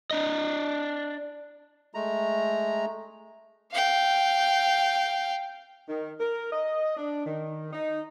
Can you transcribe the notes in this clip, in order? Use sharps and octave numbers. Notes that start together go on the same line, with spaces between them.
D4 D#5
G#3 A3 A#5
F5 G5
D#3
A#4
D#5
D4
D#3
D#4